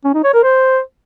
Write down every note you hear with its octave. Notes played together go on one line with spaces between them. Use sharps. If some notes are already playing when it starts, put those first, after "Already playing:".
C#4
D#4
C#5
A#4
C5